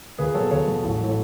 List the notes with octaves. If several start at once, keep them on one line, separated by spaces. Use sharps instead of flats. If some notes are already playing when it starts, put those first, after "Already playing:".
C#2 G#4 B4
B2 F#3 A4 C#5
C#2 A4 C#5
B2 F#3
A1
A2 F#3